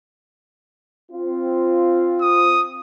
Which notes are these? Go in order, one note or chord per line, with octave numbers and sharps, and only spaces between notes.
C4 F4
D#6